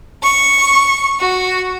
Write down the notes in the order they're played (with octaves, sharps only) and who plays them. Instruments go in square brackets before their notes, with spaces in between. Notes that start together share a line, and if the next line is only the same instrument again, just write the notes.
[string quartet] C#6
F#4